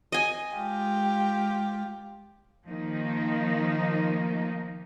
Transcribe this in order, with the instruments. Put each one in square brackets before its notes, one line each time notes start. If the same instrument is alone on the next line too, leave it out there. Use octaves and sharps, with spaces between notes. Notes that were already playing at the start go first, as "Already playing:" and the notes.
[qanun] D#5 G#5
[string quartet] G#3 F4 G4
[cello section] D#3 F3 A#3 D#4